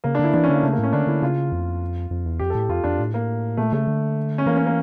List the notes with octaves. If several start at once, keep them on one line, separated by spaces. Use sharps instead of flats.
C#3 A#3
D4
D3 E4
E3 D4
C#4
D3 A#3
C#3 A3
A#3
A2 C#4
D3 D4
D3 E4
C#3 F4
F2
F2
E2
F2 G4
A4
A2 G4
F2 F4
F2 D4
A2
A#3
A#2 A3
C#3 A3
D3
C#4
E3 A#3
C#4
A#3